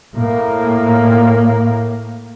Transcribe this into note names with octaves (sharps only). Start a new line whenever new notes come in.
A2 A#3